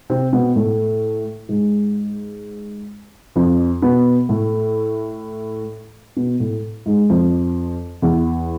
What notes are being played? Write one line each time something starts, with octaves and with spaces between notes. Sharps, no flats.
C3 C4
B2 B3
A2 A3
G#2 G#3
F2 F3
B2 B3
A2 A3
B2 B3
A2 A3
G#2 G#3
F2 F3
E2 E3